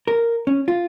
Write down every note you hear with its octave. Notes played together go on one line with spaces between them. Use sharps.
A#4
C#4
F4